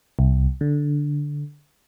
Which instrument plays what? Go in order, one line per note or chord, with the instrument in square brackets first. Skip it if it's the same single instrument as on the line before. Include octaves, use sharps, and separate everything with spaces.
[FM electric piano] C2
D3